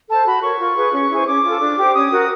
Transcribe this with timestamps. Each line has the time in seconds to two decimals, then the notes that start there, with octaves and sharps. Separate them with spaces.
0.08 A4 C5 A5
0.26 F#4 B5
0.42 A#4 C#5 C#6
0.59 F4
0.76 G#4 B4
0.93 C#4
1.10 E4 G#4 C5
1.26 C#4 D6
1.43 F4 A4
1.61 D4
1.77 G4 C5
1.94 C#4 D#6
2.11 F#4 A#4